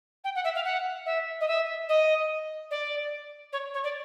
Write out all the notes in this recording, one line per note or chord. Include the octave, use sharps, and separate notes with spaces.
G5
F#5
E5
F5
F#5
E5
D#5
E5
D#5
D5
C#5
C#5
D5